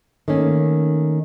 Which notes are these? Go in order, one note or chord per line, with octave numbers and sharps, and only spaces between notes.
D#3 A3 A#3 C#4